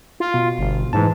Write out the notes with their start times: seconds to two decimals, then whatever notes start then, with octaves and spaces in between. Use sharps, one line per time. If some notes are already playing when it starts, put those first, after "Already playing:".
0.20 F4
0.34 B2
0.59 G1
0.93 G#2 E3 A5